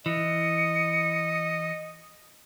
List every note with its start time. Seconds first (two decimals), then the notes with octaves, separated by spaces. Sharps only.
0.06 E3 D#5 C#7